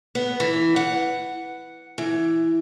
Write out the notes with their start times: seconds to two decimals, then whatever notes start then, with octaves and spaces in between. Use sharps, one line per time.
0.15 B3
0.40 E3
0.76 F#5
1.98 E3